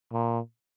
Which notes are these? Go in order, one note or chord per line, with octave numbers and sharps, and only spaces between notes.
A#2